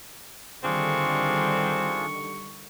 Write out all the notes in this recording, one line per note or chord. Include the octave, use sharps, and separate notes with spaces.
D3 D#3 G3 C4 D4 F4 G#4 C#6